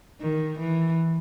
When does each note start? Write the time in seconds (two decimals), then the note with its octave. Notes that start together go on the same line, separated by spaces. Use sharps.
0.21 D#3
0.58 E3